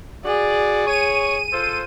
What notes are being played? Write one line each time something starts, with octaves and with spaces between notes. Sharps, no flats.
F#4 G#4 D5
C#5 D#7
F4 A4 C5